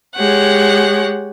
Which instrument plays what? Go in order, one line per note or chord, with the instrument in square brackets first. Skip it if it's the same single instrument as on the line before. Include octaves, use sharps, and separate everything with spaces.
[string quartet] G#3 G4 C#5 F#5